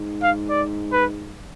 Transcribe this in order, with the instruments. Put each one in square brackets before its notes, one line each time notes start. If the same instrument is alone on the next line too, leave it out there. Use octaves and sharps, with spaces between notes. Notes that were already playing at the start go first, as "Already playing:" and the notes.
Already playing: [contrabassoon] G#2
[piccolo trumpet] F5
D5
B4